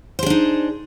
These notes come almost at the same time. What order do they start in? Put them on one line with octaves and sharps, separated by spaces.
C5 G#4 D4 D#4